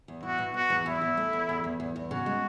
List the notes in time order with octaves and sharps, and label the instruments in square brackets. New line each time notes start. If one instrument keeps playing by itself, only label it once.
[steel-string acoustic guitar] E2
[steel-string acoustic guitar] E4 [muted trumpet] F#4
[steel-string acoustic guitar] B2
[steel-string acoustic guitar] B2 [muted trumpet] F#4
[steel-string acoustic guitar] E2
[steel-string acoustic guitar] E2 [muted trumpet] E4
[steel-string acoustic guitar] E2
A3
E2
E2
E2
E2
E2
[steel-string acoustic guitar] C#3 [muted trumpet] F#4
[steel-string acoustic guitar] G#3